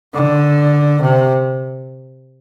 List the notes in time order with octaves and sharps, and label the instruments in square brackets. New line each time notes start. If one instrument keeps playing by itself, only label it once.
[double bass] D3
C3